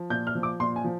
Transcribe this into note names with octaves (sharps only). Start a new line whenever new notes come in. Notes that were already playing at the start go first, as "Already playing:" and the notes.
Already playing: F3
A#2 G6
F6
F3
D6
A#2 C6
G#5
F3